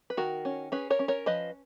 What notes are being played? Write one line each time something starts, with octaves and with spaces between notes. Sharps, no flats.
B4
D#3 F#4 A#4
C#4
C#4 G#4 B4
A#4 C#5
C#4
A#4 C#5
F3 B4 D#5